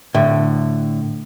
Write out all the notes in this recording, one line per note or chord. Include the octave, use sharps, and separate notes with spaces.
A2 D3